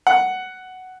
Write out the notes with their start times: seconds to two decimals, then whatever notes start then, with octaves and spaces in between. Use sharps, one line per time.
0.07 F#5